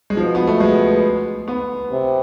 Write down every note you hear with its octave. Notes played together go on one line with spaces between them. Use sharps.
G#3
B2 F3
B3
A3
G#3
B3
C3